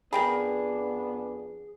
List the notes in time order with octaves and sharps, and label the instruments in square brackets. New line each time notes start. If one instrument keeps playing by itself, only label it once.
[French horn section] F2 B3 D4 [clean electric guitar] G#4 [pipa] A#4 G5 B5